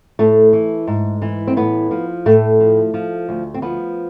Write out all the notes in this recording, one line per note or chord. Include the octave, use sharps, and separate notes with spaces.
A2 A3
E3
G#2
E3
C4
A2 B3
F3
A2 A3
F3
F3
D2
C4
F3 B3